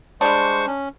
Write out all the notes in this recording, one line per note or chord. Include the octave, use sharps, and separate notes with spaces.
G3 G#3 D4 C5 C#6
C#4